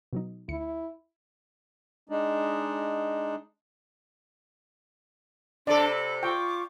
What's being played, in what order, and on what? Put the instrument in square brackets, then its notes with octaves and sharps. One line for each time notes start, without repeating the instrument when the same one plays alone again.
[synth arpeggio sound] B2 F#3 D#4
[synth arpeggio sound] D2 C#7 [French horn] E4
[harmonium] G#3 D4 D#4
[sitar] C3 A4 [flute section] D4 A5 C6 [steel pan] D5
[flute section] B5
[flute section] F4 C#6 D6 [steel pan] G5